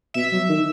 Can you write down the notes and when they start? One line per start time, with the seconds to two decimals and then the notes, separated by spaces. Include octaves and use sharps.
0.14 B2 E5
0.32 F#3
0.49 D#3